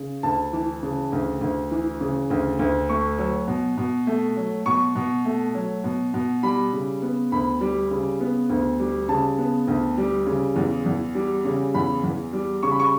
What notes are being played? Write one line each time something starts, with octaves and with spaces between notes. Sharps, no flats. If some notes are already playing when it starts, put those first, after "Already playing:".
Already playing: C#3
D2 A5
E3
C#3
D2
D2
E3
C#3
D2
D2
A3 C#6
F#3
B2
B2
A3
F#3
B2 C#6
B2
A3
F#3
B2
B2
G3 B5
C#3
B3
D2 B5
G3
C#3
B3
D2
G3
C#3 A5
B3
D2
G3
C#3
E2
E2
G3
C#3
E2 B5
E2
G3
C#3 C#6
B5
C#6